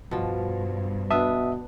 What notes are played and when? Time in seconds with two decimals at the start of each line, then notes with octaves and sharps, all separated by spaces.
0.11 G2 B2 F3
1.11 B2 B3 D4 E5 A5 D#6